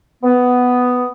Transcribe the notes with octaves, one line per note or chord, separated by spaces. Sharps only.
B3